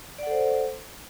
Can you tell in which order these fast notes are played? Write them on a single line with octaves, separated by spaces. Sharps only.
D5 F#5 A4 C5